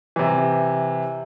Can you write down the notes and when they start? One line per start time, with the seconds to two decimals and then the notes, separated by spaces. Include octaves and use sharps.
0.16 C3 E3